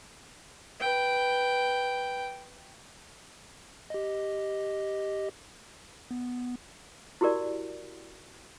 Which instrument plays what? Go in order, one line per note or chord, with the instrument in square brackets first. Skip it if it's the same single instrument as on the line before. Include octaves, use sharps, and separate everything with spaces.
[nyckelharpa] B4 G5
[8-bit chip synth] G4 D#5
B3
[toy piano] E4 F#4 G4 A#4 D5